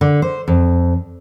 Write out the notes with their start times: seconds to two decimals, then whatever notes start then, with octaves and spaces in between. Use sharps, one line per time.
0.01 D3
0.22 C5
0.48 F2